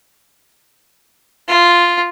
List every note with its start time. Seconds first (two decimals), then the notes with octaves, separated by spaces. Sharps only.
1.48 F4